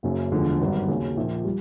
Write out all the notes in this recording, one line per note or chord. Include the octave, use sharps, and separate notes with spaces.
F#1 F#2 C#3 F#3
E1 D2 D3 F3 G#3
G#1 G2 D#3 F#3
D#2 C#3 F#3
A#1 A#2 F3
G3